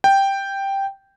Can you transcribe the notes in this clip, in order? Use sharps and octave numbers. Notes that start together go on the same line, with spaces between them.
G5